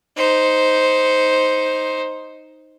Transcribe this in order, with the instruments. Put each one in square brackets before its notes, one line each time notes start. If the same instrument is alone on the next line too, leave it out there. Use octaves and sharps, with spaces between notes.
[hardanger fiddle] D#4 C5